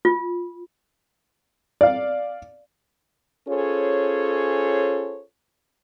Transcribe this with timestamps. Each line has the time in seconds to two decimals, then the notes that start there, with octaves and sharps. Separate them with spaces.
0.05 F4
1.81 D5 F5
3.48 C#4 F4 G#4 A4 C5 C#5